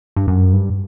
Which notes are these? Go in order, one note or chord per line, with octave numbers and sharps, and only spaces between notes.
G2
F#2
G2